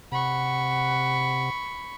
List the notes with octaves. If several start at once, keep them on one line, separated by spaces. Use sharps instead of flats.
C3 F#5 B5 C#6